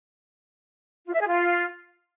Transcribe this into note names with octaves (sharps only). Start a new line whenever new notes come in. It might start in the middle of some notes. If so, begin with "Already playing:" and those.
F4
E5
G#4
F4